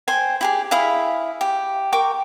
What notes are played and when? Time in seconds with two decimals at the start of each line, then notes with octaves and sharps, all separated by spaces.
0.08 C5 G5 G#5
0.41 E4 G4 G#4
0.71 E4 G#4 E5 F5
1.41 G4
1.92 A#4 G5 C#6 D6